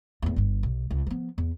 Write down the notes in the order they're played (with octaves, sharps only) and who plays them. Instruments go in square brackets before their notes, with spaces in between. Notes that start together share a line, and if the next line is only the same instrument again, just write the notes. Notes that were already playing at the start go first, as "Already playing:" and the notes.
[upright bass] E2 A2
G1 G2
B1
C#2
F3 B3
E2